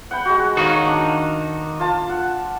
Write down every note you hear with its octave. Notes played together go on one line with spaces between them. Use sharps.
F#5 G5 B5
G#3 F#4
D#3 D#4 F#4 C#5 F5 A#5
D4
F4 A5
F#5